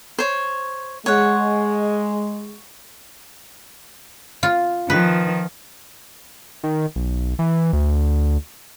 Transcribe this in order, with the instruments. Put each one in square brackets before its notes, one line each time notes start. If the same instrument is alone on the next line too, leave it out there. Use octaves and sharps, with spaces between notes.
[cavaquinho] C5 C#5
[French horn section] G#3 [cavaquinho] C#5 F#5
[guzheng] F4
[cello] D#3 F3 [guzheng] B4
[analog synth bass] D#3
B1
E3
D2